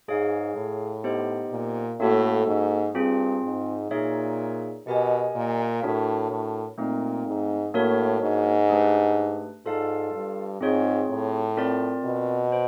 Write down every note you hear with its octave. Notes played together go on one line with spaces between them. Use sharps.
G#2 G#4 C#5 F5
A2
B3 D#4 G4 C5 D#5
A#2
A2 A#3 C#4 F#4 A4
G#2
G2 C4 F4 G#4
G#2
A#2 D#4 G#4 C#5 E5
B2 G4 A#4 D#5 G#5
A#2
A2 D4 F#4 A#4
A2
A#2 A3 C4 D#4
G#2
A2 A#3 D4 F#4 A#4 C#5
G#2
A3 D4 G4 B4
G#2 F4 A4 D5 F5 A5
G2
G#2 C4 F4 G#4 C#5
A2
C4 F4 A#4 D5
B2
C5